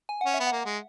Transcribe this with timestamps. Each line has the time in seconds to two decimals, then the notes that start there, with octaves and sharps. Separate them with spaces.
0.09 G#5
0.21 C#4 F#5
0.34 E5
0.40 B3
0.47 F#5
0.52 A#3
0.65 G#3